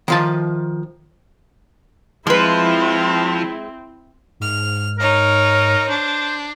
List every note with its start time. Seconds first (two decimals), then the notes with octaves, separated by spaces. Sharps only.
0.08 D#3 F3 A5
2.27 F3 G#3 C4 E4 B4
4.40 G#2 F6
4.99 D#4 A#4 C#5
5.89 D4 C5